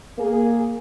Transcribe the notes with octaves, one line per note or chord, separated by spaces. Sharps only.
A#3 G#4